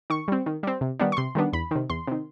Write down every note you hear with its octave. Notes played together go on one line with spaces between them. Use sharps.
D#3 C#6
G3 C4
D#3
G3 C4
C3
D#3 G3 B3 D4
C#6
C3 C6
D#3 G3 B3 D4
E2 B5
C3 D#3
E2 C6
C3 D#3